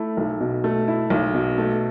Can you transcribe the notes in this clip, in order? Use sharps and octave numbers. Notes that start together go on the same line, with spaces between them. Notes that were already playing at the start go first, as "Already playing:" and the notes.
Already playing: A3 E4
B1
B2
A3
E4
B1
B2
A3